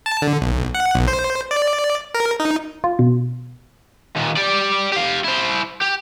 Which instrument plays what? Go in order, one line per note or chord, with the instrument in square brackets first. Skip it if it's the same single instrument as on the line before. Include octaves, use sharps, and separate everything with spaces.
[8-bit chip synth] A5
D3
B1
F#5
B1
C5
D5
A#4
D#4
[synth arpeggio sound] F4
B2
[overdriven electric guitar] D#2 A#2
G4 D5
G4 F5
E4 C5
G4